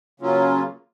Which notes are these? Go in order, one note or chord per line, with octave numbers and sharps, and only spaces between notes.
C#3 F#3 A#3 C#4 F4